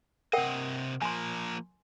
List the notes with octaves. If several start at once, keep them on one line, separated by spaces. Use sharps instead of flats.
C3 A#4 D#5 F#5 G5
F3 A#3 G#5 C6